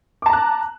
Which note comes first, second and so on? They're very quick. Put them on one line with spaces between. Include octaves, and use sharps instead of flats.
D6 A5 A#5 F#6